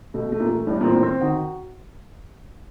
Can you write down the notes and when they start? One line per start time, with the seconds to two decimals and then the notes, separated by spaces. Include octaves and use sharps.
0.14 B2 A3
0.32 A3
0.40 A#2
0.49 A3
0.67 A2 G3
0.81 A#2 C4
0.95 A2
1.03 C4
1.21 D#3 F#4